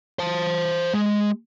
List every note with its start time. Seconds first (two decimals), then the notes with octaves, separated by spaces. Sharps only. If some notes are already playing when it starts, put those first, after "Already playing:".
0.19 C5 A5
0.94 G#3